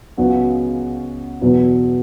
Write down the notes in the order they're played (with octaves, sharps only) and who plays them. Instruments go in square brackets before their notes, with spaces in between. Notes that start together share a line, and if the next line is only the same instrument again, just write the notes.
[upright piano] C#2 C#3 F#3 B3 F#4
E2 B2 F#3 B3